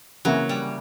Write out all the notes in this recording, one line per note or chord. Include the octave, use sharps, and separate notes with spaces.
C#3 E3 F#3 A#3
G3